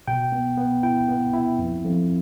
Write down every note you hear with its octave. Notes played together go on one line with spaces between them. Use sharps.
B2 G5
B3
B3
E4 G5
B3
E4
F2
F2